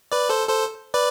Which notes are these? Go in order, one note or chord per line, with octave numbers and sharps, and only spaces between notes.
B4 D5
A4 C5
A4 C5
B4 D5